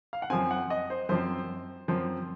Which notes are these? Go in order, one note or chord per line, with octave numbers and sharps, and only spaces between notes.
F5
F#5
F#2 F3 C4 G#5
F#5
D#5
C5
F#2 F3 C4 C5
F#2 F3 C4